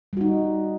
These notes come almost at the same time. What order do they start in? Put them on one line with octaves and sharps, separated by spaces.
G3 F#4 D#4